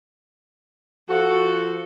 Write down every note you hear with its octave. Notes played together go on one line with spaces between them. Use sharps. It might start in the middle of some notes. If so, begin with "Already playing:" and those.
F3 F4 F#4 A4